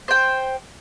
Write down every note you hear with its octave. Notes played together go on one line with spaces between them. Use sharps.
C5 G5